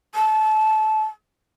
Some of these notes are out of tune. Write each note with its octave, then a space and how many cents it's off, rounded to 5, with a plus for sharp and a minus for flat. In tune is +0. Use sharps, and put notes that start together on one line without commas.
A5 -25